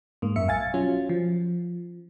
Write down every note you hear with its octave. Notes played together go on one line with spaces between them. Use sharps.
G#2 A#3
F#2 E5 C#7
B1 F5 G#5 A6
F#3 C#4 F4
F3